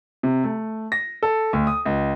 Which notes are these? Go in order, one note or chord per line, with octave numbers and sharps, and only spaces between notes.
C3
A3
A#6
A4
D2
D#6
C#2